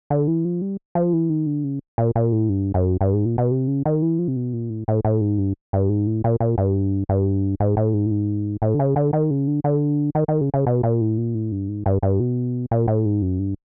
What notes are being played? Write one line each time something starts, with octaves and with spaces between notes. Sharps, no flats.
D3
E3
F3
G3
F3
E3
D#3
D3
C#3
A#2
A#2
A2
G2
F#2
G2
G#2
A#2
B2
C3
C#3
D#3
E3
F3
C3
B2
A#2
A2
A2
A2
G#2
G2
G2
G#2
A2
A#2
A#2
G2
G2
G#2
A2
G#2
A2
G#2
A2
D3
C#3
D3
D#3
C#3
D3
D3
D#3
D#3
C#3
C#3
B2
A#2
A2
A#2
A2
G2
G#2
G2
G2
B2
A#2
A2
G#2
F#2
G2